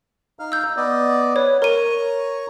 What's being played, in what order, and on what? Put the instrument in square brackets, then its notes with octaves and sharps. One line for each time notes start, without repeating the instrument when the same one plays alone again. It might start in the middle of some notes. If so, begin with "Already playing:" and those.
[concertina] D#4 F5 F6
[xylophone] E6 G6
[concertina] B3 D5 D#5
[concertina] B4 [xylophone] C#5
[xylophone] A#4 D#7 [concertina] C#5 A#5 C#6